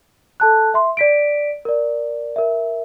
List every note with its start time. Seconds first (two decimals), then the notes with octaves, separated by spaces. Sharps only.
0.40 A4 A5 F#6
0.74 E5 C6
0.97 D5 B6 D7
1.65 A#4 D5
2.36 A#4 E5